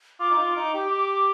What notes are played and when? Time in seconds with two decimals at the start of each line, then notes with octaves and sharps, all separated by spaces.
0.20 F4 D6
0.31 D#4
0.38 F4
0.56 D#4
0.74 G4
0.92 D6